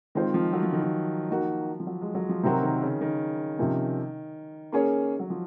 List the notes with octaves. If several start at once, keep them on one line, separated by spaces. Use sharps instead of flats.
D#3 G#3 C4 F4 C5
F3
F#3
F3
D#3
F3
D#3 A#3 D#4 F#4
F3
F#3
G#3
F#3
F3
C3 D#3 F#3 C4 F#4 A#4
D#3
C#3
D#3
C3 F3 A#3 C#4
A#3 C#4 G#4 C#5
F#3
F3